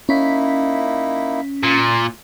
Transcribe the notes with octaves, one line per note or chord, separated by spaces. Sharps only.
A#3 C#4 D#4 E4 B6
A#2